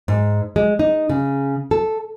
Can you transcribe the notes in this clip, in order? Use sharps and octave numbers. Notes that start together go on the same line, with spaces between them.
G#2
G#3
D#4
C#3
A4